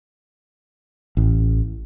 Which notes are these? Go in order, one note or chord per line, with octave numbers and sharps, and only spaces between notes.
A1